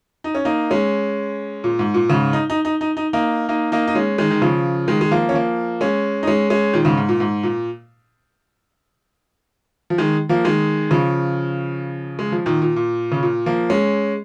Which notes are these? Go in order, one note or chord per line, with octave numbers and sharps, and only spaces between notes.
D#4
C#4
A#3 D#4
G#3 C#4
A#2
G#2
A#2
G#2 C#3
D#4
D#4
D#4
D#4
D#4
A#3 D#4
A#3 D#4
A#3 D#4
D#4
G#3 C#4
D#3 G#3
D#3
C#3 F3
D#3 G#3
G#3
F3 A#3
C#4
F3 A#3
G#3 C#4
D#4
G#3 C#4
G#3 C#4
A#2 D#3
G#2 C#3
G#2
A#2
G#2
A#2
F3
D#3 G#3
F3 A#3
D#3 G#3
C#3 F3
G#3
F3
A#2 D#3
A#2
A#2
C#3
A#2
F3 A#3
G#3 C#4